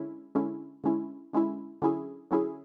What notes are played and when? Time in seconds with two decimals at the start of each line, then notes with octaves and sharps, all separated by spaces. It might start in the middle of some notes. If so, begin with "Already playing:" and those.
Already playing: D3 G#3 C#4 E4
0.35 D3 G#3 C#4 E4
0.84 D3 G#3 C#4 E4
1.33 D3 G#3 C#4 E4
1.82 D3 F#3 C#4 E4 G#4
2.31 D3 F#3 C#4 E4 G#4